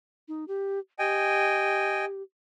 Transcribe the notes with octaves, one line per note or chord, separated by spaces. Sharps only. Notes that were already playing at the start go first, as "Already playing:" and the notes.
D#4
G4
G4 D#5 G5 G#5